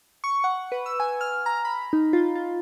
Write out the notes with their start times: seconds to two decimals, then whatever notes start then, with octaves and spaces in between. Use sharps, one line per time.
0.24 C#6
0.44 F#5
0.72 B4
0.86 E6
1.00 G#5
1.21 F6
1.46 A#5
1.65 B5
1.93 D#4
2.13 F4
2.35 F4